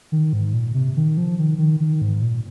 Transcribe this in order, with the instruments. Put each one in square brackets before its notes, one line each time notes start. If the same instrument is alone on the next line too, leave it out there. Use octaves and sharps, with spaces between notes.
[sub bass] D#3
G#2
A#2
C3
D#3
F3
D#3
D#3
D#3
G#2
A#2